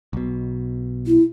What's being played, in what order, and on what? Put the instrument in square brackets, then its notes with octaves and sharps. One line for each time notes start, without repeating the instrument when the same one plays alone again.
[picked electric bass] B1 B2
[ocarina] E4